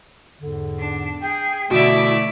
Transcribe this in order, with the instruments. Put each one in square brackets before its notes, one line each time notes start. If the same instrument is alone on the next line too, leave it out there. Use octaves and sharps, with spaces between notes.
[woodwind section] E2 G#2 D3
[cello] D4
[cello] G#4 [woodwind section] G5
[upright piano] B2 [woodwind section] D3 A3 [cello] E3 E4 [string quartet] D5 E5 D6